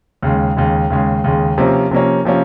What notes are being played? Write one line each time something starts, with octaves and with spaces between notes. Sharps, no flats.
D#2 C#3 G#3
D#2 C#3 G#3
D#2 C#3 G#3
D#2 C#3 G#3
C3 F3 A#3 C#4
C3 F3 A#3 C#4
C3 F3 A#3 C#4